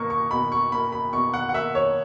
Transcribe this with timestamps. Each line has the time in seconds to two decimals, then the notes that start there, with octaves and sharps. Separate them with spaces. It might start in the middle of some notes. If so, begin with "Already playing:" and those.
Already playing: B2 A#3 C#6
0.10 C#6
0.31 B2 B5
0.52 C#6
0.72 A#3 B5
0.92 B5
1.13 B2 C#6
1.34 F#5
1.49 F#5
1.54 A#3 E5
1.75 C#5